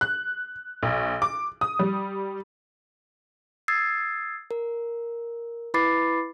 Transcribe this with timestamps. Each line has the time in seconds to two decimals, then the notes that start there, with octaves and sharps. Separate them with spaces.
0.01 F#6
0.83 B1
1.22 D6
1.61 D#6
1.79 G3
3.68 D#6 E6 G#6 A6 C7
4.51 A#4
5.74 E4 B4 B5 D6 A6 C7